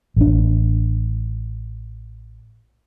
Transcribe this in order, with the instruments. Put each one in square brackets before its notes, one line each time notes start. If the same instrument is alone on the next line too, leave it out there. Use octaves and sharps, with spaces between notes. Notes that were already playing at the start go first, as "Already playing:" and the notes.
[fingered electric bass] A1 D4